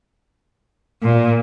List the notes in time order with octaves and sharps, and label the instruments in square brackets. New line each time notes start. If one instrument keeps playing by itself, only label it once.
[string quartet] A#2